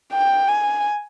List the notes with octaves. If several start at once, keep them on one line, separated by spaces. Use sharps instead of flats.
G5
G#5